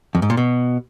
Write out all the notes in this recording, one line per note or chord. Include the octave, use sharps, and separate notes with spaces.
F2
G#2
A#2
B2